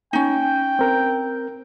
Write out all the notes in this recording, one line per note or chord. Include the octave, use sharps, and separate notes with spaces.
C#4 D#4 G5
C4 A#4